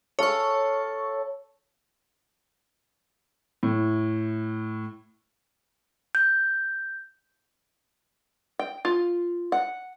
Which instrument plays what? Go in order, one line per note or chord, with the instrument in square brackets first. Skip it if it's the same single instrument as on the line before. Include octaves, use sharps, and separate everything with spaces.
[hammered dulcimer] A4 F5 [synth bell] C#5 C#6
[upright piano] A2
[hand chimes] G6
[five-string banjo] G5
F4
F#5